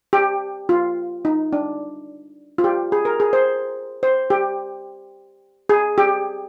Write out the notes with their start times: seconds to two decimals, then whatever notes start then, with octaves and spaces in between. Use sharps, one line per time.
0.13 G4
0.69 F4
1.25 D#4
1.53 D4
2.58 F4
2.64 G4
2.92 G#4
3.05 A#4
3.20 G#4
3.33 C5
4.03 C5
4.30 G4
5.69 G#4
5.98 G4